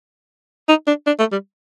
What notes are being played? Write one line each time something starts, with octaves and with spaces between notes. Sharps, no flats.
D#4
D4
D4
A3
G3